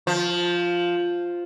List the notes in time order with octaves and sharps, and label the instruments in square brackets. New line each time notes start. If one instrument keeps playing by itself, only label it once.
[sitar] F3